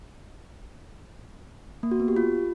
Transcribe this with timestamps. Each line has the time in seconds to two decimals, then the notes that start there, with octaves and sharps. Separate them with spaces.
1.83 A#3
1.91 F#4
2.00 B3
2.08 G4
2.16 F4